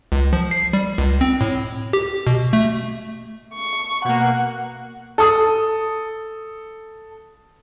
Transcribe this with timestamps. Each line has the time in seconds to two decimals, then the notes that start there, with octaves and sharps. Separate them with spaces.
0.12 C#2
0.33 F3
0.51 C7
0.73 G3
0.98 C#2
1.21 C4
1.41 A2
1.93 G4
2.27 B2
2.53 A3
3.54 C#6
4.05 B2 A#3 F#5
5.18 A4 D#6